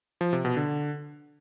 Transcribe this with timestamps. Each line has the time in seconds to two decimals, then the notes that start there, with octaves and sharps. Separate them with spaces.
0.21 F3
0.33 C3
0.45 B2
0.57 D3